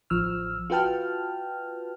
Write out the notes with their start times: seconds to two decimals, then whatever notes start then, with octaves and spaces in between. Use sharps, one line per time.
0.10 A1 F3 E6 F6
0.70 F4 F#4 B4 G5 A5 F6